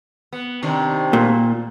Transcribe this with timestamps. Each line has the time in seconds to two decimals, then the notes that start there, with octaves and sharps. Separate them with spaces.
0.33 B3
0.63 C3 D#3 D4
1.13 A#2